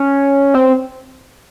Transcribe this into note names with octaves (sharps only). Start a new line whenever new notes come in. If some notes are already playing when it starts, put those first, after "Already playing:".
Already playing: C#4
C4